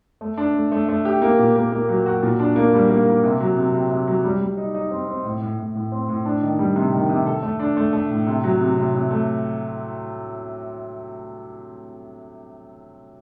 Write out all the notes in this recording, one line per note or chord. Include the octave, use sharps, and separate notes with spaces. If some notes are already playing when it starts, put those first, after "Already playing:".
A3
D4
A3
A3
A3
G4
A#3
A#2
A#3
A#3
F#3
F#4
A#2
D4
A#3
G3
A#3
A#3
C3
F#3
C3
C3
C3
F#3
G3
G3
D#4
D#4
C4
C4
A2
A2
A2
A2
C4
A2
D4
D#3
G3
C3
D#3
C3
A4
A3
D4
A3
A3
A2
C3
F#3
C3
C3
C3
A3